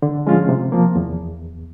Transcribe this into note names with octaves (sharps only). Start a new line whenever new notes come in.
D3
F3 G#3 C#4 F4
C3
F3 A#3
E2